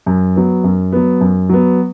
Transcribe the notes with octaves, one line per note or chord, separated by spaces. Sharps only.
F#2
F#3 B3
F#2
F#3 B3
F#2
F#3 B3